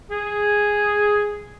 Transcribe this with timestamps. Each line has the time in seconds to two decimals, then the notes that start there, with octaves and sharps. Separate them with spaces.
0.10 G#4